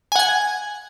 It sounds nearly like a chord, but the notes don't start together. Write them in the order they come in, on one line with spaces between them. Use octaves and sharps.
G#5 F#5 G#6